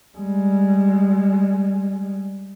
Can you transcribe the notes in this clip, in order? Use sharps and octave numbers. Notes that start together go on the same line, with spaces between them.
G3 G#3